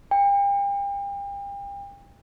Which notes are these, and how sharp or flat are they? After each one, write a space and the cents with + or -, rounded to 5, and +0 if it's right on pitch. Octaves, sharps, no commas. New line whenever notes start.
G5 +35